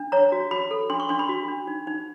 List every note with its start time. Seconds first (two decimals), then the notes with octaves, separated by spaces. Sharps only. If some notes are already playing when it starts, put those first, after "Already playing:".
Already playing: D4
0.12 C#5 A#5
0.32 F#4
0.51 F#4 B5
0.71 A4
0.90 D4 C6
1.00 C#6
1.09 D4 C6
1.19 B5
1.29 F#4
1.48 D4
1.67 D#4
1.87 D#4